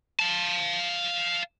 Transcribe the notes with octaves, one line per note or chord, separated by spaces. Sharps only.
F5 A5